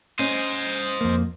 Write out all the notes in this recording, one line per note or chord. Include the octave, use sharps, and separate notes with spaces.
C#4 C5 D#5
F2 A#3